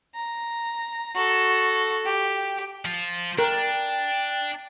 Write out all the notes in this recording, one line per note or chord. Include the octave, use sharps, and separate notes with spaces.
A#5
F#4 A4
G4
F3 F4
D4 A#4 G5